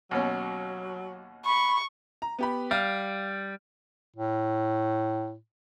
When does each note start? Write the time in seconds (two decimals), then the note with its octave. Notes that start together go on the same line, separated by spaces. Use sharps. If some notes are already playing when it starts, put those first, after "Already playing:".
0.11 D#2 B2 F#3 C#4
1.45 B5 C#6
2.22 A#5
2.39 B3 G4 B5
2.71 G3 F5 F6
4.16 A2